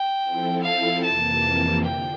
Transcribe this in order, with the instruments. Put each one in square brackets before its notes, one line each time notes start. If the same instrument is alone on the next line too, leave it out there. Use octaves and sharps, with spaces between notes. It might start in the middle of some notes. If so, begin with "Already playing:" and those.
Already playing: [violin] G5
[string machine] F3 C4 E4 A4
[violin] F5
[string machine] F2 C3 E3 A#3 [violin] A5
[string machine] D3 F3 [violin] G5